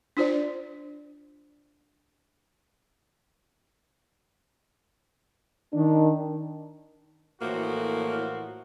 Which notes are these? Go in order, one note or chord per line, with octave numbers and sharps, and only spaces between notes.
D4 F4 C5 D5
D#3 D4
A2 E3 F3 A#3 F#4